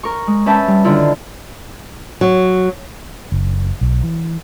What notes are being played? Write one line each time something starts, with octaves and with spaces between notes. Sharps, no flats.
A#4 C#6
G#3
C#4 B4 E5 G5 A5
G3
D3 D#3 E4 F4
F#3
F#1
B1
E3